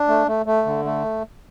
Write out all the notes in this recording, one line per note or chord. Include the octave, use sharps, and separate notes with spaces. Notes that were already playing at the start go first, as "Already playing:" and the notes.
Already playing: D4
A3
A3
A3
D3
A3